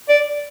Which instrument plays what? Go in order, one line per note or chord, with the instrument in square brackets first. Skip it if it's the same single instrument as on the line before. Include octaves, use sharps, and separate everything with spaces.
[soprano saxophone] D5